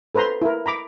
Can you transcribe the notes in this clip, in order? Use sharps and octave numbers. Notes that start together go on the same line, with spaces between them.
A4 B4 C5 A#5 C6
E4 A#4
A#5 B5 D6